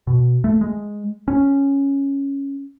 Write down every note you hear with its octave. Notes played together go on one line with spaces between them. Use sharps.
B2
A3
G#3
C#4